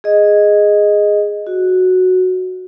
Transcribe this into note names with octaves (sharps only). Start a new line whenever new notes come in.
G#4 D#5
F#4